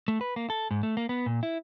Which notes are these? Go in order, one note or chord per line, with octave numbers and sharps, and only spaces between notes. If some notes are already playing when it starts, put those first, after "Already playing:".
A3
B4
A#3
A4
G#2
A3
A#3
B3
A#2
E4